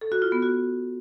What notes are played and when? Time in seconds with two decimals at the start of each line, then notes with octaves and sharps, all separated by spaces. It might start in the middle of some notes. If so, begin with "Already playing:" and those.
0.01 A4
0.12 F#4
0.22 F4
0.32 B3
0.42 F#4